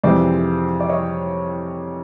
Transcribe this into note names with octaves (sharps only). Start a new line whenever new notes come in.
F2 C3 E3 G#3 C5 D5
D5
C#5 D#5